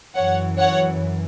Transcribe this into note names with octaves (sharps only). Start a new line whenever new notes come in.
F#2 E3 C#5 F#5
C#5 F#5